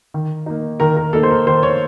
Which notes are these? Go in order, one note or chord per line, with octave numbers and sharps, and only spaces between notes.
D#3
A#3 D#4
D#3 A#4
A#4
A#3 D#4 A4
C5
A#4
D#3 C5
C#5